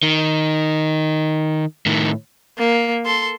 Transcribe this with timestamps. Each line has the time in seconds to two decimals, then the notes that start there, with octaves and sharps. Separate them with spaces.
0.03 D#3
1.86 A2 D#3
2.58 A#3
3.05 A4 C6